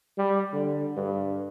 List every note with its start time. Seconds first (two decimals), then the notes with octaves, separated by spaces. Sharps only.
0.18 G3
0.53 D3
0.97 G2